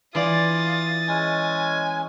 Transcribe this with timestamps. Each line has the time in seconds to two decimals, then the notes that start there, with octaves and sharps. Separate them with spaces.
0.15 E3 F4 D5 D#6 A6
1.08 G#3 C#4 G#5